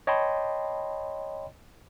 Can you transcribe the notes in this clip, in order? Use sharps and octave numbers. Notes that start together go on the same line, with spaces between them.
C#5 D#5 G5 A5 B5 C6